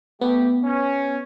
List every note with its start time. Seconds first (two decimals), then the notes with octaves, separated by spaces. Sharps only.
0.21 A3 B3 G4
0.64 C#4